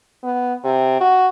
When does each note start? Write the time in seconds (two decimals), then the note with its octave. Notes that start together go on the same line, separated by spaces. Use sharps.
0.24 B3
0.64 C3
1.01 F#4